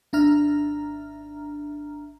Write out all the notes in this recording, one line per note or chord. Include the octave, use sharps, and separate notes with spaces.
G#1 D4 E5 A#5 F6